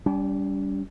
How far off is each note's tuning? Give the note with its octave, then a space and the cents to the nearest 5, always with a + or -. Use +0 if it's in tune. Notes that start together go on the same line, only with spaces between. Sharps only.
G3 +0 C#4 +45